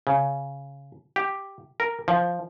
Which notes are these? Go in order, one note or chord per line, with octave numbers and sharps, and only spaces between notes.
C#3
G4
A#4
F3